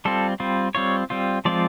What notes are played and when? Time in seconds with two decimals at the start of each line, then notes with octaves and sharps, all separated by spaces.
0.05 G3 C4 F4 A4
0.40 G3 C4 F4
0.75 G3 C4 F4 C#5
1.10 G3 C4 F4
1.45 F3 G#3 C4 F4 D5